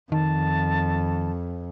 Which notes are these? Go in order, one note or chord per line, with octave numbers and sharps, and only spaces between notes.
F2 D#3 A5